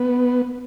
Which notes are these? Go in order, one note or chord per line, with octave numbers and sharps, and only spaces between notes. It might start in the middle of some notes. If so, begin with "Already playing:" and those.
Already playing: B3